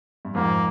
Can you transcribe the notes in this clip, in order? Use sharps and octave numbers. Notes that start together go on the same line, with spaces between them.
G2
F2 G#2 A#3